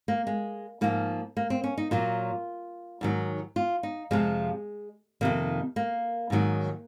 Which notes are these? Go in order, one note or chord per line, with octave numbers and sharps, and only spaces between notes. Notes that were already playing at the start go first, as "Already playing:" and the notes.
A#3
G#3
G#2 F3 A#3
A#3
C4
C#4
D#4
A#2 F#3 F4
G#2 D#3 F#3
F4
D#4
F2 C3 F3 G#3
F2 C3 D#3 A#3
A#3
G#2 D#3 F#3